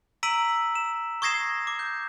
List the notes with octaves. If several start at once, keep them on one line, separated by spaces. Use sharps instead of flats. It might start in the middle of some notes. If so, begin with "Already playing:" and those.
A#5 E6 B6 D7 D#7 F#7
E7
C#6 D#6 G#6 A#6 C7 E7
D6
G6